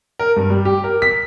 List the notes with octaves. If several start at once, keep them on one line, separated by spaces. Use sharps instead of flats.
A#4
G2
G3
G4
A#4
B6